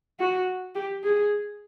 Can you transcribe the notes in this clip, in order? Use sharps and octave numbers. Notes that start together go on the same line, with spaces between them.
F#4
G4
G#4